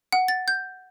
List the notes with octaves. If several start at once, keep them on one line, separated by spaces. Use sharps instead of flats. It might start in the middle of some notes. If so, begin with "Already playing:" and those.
F#5
A6
G6